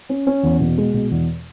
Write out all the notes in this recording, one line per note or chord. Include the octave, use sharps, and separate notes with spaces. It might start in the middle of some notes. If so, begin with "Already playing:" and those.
C#4
C#4
E2
B2
G#3
B2
E2